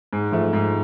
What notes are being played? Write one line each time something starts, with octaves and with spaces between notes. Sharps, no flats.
G#2
F3 A3
G#2